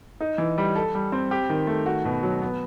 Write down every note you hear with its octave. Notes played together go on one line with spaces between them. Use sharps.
D#4
E3
G3
A4
G3
C4
G4
D#3
A3
F#4
B2
F#3
B3